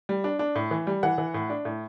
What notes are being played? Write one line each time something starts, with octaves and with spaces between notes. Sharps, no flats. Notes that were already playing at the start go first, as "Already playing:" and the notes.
G3
D4
D4
A2
E3
G3
E3 F#5
E3
A2
D4
A2